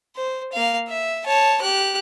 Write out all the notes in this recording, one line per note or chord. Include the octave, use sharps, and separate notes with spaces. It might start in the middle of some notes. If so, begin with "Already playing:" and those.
C5
A#3 F5
E5
C#5 A5
G4 F#6